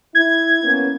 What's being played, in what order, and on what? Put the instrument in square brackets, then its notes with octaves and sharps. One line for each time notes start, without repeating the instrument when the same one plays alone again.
[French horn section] E4 [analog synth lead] G#6
[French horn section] A#3 B3 C#4